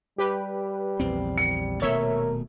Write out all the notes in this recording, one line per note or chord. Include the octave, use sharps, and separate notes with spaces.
G3 G4 B4
A#1 E2 C4
C#7
D#1 B2 A3 A#4 C#5 E5